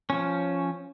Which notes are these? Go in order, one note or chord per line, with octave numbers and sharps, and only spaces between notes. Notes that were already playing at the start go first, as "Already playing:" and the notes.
F3 C#4